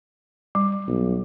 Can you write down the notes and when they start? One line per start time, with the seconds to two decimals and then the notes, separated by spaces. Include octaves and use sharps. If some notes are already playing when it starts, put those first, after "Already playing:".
0.55 G3
0.87 B1